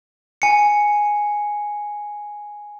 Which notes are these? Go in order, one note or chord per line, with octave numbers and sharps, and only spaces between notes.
G#5 C#7